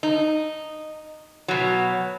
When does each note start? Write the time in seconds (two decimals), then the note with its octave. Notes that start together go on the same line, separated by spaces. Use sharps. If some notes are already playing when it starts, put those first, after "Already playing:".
0.03 D#4
1.48 B2 F#3